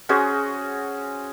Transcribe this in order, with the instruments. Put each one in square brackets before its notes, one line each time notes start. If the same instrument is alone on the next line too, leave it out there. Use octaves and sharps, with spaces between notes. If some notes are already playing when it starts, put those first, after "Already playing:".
[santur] C#4 F#4 G#4 C5